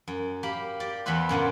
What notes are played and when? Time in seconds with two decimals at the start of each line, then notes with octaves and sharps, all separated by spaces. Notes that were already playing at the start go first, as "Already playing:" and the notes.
0.08 F#2
0.43 A#3 G4 B5
0.80 G4 D5
1.06 E2 E3 B3 E4 B4 C5
1.29 F#2 A#2 D3 F#3